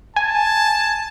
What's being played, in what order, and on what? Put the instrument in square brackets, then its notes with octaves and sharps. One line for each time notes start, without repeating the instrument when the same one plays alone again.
[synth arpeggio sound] G#5 [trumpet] A5